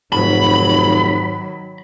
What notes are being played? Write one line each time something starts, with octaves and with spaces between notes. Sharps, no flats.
F1 G#2 D#3 F#3 B5